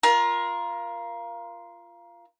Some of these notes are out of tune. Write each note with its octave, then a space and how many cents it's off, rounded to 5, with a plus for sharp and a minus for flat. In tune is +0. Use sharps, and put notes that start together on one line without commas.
F4 -15 A#4 +20